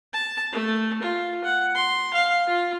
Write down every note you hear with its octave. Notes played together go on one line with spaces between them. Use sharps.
A5
A3
F4
F#5
C6
F5
F4